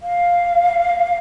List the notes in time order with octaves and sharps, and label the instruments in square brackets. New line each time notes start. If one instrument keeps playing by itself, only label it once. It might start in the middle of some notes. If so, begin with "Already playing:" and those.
[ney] F5